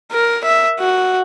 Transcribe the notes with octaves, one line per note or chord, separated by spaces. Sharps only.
A#4
E5
F#4